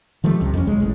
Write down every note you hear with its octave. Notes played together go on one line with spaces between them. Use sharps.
D#3 F3 G3 A3
C#2 C3
F2 C#4
B1 G#3
A1 A2